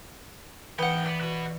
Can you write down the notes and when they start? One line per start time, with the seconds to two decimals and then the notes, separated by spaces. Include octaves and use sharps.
0.79 G#2 E3 B3 F#5 G5
1.06 B3 D5
1.21 F#4 B4